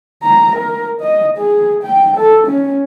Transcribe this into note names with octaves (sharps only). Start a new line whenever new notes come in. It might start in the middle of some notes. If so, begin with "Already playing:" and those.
A#5
A#4
D#5
G#4
G5
A4
C#4